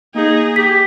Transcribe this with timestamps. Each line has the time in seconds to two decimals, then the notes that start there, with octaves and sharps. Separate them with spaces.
0.15 A#3 D#4 G#4
0.56 G4 B6